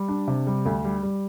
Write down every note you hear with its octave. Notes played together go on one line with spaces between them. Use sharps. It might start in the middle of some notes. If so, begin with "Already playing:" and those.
Already playing: G3
D4
C3
G3
D2
G3
G3